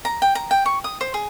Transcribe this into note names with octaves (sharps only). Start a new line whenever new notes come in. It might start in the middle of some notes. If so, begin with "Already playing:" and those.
A#5
G5
A#5
G5
C#6
D#6
C5
G#4